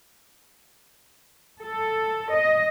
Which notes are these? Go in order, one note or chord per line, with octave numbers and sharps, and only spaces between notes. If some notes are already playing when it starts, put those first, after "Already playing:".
A4
D#5